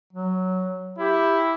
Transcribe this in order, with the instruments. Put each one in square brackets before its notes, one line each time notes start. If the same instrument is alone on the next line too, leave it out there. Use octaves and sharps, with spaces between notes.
[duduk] F#3
[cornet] E4 [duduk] G4